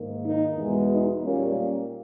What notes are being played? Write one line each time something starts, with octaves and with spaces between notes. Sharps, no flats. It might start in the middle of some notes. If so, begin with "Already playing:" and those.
Already playing: G#2 D#3 A#3
D#4
E2 B2 G#3
D#4
A#2 G3 A#3 C#4